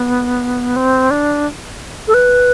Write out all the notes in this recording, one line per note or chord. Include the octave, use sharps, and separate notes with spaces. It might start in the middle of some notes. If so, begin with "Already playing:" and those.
Already playing: B3
C4
D4
A4
B4